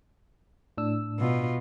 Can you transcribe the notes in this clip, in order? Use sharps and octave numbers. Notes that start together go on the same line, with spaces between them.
A2 D4 E6
B2 F4